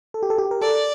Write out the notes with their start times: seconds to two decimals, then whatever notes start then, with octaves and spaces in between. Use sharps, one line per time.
0.14 A4
0.23 G4
0.30 A4
0.38 G4
0.51 A#4
0.61 A4 D5